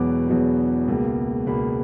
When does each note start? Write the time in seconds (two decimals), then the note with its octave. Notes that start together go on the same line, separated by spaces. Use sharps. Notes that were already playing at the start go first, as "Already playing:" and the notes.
Already playing: E1 E2 B2 F#3 B3 D6
0.28 E1 E2 B2 F#3 B3
0.88 C#2 B2 A#3
1.46 C#2 B2 A#3 B5